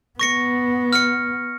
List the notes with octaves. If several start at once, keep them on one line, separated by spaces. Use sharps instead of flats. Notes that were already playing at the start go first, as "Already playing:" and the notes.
B3 C#6 A#6 C#7
F6 C#7